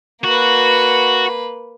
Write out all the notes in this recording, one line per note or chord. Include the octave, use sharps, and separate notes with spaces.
A#3 F#4 B4